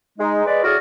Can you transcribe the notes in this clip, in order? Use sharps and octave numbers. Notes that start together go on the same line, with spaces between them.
G#3 D#4
G#3 B4 D5
A2 D3 F#4 G#4 D5 F6